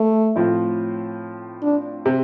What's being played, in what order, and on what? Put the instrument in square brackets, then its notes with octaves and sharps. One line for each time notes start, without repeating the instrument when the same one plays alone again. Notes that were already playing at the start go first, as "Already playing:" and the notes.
Already playing: [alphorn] A3
[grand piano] A2 F3 C4 F4
[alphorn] D4
[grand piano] C3